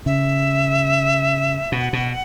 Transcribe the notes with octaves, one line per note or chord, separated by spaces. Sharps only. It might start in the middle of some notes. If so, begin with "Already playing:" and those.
C#3 E5
B2 F#5
B2